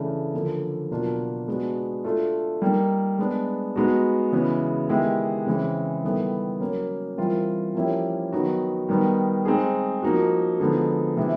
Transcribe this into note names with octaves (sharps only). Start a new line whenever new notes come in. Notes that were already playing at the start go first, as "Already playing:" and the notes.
Already playing: C#3 E3 A3 D4
D3 F3 A#3
B2 F#3 A#3 D4 F4
G#3 B3 D4 F#4
A3 D4 F4 A4
G3 A#3 D#4
G#3 B3 D4
G#3 B3 D#4 F#4
C#3 E3 G#3 B3 E4
D#3 G#3 B3 E4 G4
C#3 E3 G#3 C4 E4
D#3 G3 B3 E4 A4
F#3 A#3 C#4
E3 G3 C4 F4 A#4
F3 A#3 C#4 E4 G4
D#3 F#3 B3 D#4 F#4
D#3 G3 B3 D#4
G#3 C4 D#4 G#4
F3 A#3 D#4 F#4
D3 F3 G#3 B3 D#4
C3 E3 G#3 B3 E4